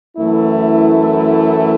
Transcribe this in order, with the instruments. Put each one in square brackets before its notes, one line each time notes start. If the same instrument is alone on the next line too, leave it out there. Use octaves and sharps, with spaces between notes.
[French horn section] F#2 E3 A3 E4